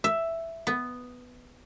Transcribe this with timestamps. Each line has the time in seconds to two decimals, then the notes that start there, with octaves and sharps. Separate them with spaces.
0.04 E5
0.67 B3